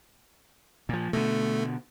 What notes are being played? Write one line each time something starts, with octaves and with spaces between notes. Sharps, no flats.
A#2 F3
B2 D3 A3